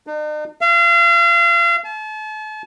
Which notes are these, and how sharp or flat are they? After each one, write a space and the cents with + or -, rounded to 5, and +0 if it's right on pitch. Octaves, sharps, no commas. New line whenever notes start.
D#4 -45
F5 -35
A5 -40